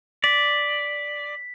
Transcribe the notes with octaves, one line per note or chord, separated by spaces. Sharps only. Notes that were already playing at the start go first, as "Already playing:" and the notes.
D5 B6